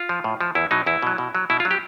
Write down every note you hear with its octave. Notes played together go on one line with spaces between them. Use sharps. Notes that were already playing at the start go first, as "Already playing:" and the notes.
Already playing: F4
F3
A2
F3
E2 E4
B2 F#3 D#4
E2 E4
B2 F#3
B2
F#3
B2 E4
F4
F#3
G4